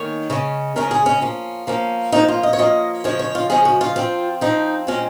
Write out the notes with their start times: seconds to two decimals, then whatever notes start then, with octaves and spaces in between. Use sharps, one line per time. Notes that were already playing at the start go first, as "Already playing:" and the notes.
Already playing: D#3 A#3 C#4 C#5
0.30 C#3 G#3 C#4
0.76 C#3 G#3 C#4 A#4
0.91 G#4
1.06 C#4
1.21 F3 A#3 C#4
1.67 F3 A#3 C#4
2.12 F3 A#3 C#4 D#4
2.28 F4
2.43 D#5
2.53 C#5
2.59 F3 A#3 C#4 D#5
3.04 C#3 F3 G#3 C#4 C#5
3.19 C#5
3.35 F4
3.50 C#3 F3 G#3 C#4 G#4
3.65 F#4
3.81 F4
3.96 F3 C4 F4
4.41 F3 C4 D#4
4.87 A#2 G#3 C4 C#4